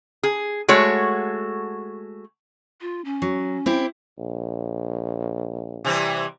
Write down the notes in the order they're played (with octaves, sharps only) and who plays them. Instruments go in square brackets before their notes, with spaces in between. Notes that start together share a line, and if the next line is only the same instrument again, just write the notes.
[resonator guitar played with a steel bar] G#4
G#3 A3 F#4 C#5
[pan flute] F4
C#4
[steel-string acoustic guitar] F#3
C4 E4 G4
[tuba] A#1
[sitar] C3 E3 G3